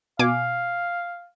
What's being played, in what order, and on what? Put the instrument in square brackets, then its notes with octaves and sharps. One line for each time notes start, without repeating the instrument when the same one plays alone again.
[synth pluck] B2 G#5 D6 [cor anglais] F5